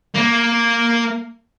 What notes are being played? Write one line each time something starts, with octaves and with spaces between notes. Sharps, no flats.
A#3